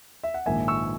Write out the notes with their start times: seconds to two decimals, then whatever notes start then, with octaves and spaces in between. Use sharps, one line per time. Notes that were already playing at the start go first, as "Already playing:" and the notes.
0.24 E5
0.34 F#5
0.46 A#1 G#2 D#3 A#3 E5 G#5
0.68 C#6 E6